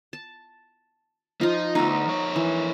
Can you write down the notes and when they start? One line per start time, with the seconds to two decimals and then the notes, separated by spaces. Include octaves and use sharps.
0.13 A5
1.41 F3 D#4 F4
1.75 D2 B3 D#4 E5
2.07 F2 C#5
2.36 E3